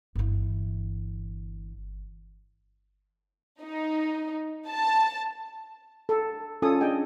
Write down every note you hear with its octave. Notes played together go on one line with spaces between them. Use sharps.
G1 E3
D#4
A5
A4
C#4 F4 A4 G#5 D#6
D4 G#4 D#5 G5 G#5